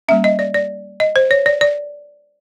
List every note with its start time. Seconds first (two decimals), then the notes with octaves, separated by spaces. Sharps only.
0.08 G3 A#3 C#4 E5
0.24 D#5
0.39 D5
0.54 D5
1.00 D#5
1.16 C5
1.31 C#5
1.46 D5
1.61 D5